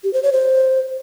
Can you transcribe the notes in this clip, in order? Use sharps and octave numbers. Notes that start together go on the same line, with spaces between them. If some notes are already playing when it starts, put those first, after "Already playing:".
G4
C5
C#5
C5